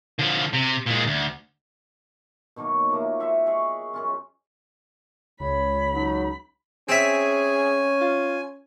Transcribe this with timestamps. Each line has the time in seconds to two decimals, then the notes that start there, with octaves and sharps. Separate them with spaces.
0.19 D3 F3
0.53 C3
0.86 A#2 G#3
1.06 D2
2.56 B2 D#3 F#3 A#3
2.90 F3 A3 A#3
3.19 C5 E5 F#5
3.46 G#4 C#5 D#5 E5
3.94 F#2 C#4 F4
5.40 C#2 C#5 B5
5.94 F#3 D#4
6.89 C4 C#4 G#4 E5 G#5
8.01 F4